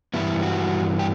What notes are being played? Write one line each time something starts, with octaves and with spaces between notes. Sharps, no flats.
G2 E3 G3 B3 E4
F#4
G4